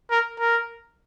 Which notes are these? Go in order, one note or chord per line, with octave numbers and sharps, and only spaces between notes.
A#4
A#4